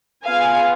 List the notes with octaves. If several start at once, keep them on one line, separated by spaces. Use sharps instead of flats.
B3 F4 G#4 F5 G#5